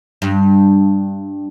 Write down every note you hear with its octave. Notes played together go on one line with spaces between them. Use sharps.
G2